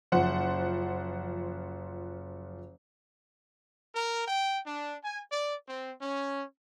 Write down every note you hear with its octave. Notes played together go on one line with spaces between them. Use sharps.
F#1 F3 C5 F#5
A#4
G5
D4
G#5
D5
C4
C#4